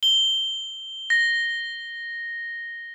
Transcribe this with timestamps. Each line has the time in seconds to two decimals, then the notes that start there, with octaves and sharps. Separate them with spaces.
0.03 G7
1.10 A#6